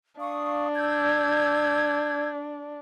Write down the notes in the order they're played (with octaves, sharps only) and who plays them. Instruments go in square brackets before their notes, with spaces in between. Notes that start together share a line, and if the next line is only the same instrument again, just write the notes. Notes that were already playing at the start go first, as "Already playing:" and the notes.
[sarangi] D4 [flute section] F5 C#6 D#6
[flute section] E6 G6 G#6